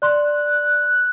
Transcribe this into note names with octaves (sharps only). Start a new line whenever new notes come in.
D5 C6 F#6